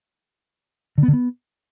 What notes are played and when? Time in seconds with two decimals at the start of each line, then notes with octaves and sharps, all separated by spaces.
0.98 D3
1.03 B3
1.08 D3
1.13 B3